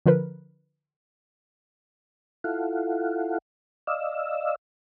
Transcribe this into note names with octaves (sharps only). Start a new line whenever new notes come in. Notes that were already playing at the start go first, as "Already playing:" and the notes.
D3 F3 A#4 B4
E4 F4 A4 F5 F#5
D5 D#5 F5 E6